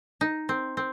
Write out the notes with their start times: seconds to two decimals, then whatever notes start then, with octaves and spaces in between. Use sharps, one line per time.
0.21 D#4
0.49 C4
0.77 C4